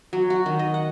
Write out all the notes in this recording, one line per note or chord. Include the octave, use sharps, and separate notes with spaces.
F#3
F#4
D#3
D#5
F#5